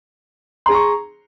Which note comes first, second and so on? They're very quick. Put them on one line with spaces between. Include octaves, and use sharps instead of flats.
C6 G#4 A#5 C#6